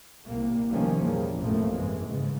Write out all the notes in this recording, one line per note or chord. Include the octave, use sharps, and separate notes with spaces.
C2 A#3
C3 D#3 F3 G3 A#3 C#4
E2 A#2 G3
A1 F#2 C3 F3 A3 A#3
G#2 E3 G#3
G#2 C#3